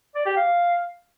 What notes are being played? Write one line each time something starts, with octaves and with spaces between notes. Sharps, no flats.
D5
G4
F5